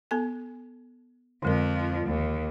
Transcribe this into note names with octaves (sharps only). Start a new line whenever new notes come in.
B3 A4 G#5
F2 D3 F3 G#3 A#4
D#2